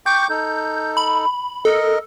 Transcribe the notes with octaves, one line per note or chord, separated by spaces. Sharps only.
G5 C#6 D6 G6
D#4 A4
B5
A4 A#4 D#5